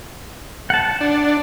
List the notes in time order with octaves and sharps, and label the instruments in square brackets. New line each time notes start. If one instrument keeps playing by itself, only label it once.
[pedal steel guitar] F#5 A5
[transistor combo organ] D4